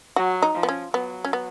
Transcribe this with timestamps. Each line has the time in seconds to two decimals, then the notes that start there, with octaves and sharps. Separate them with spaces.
0.16 F#3 F#4
0.42 D#4
0.55 F3
0.63 B3
0.69 C#4
0.93 F#3 B3
1.24 C#4
1.33 B3